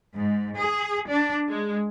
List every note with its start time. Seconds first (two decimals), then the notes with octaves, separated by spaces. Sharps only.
0.16 G#2
0.56 G#4
1.09 D4
1.49 G#3